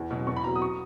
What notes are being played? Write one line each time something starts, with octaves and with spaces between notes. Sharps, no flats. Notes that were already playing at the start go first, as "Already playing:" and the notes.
Already playing: E2
B2 F#3
E2 C#6
B5
B2 F#3 A#5
D#6
C#6